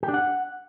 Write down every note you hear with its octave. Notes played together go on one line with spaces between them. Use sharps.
G4
D4
F#5